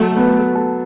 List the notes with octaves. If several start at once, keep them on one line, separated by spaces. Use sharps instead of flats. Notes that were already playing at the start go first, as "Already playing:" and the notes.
Already playing: F#3 A3 A4
B3
A4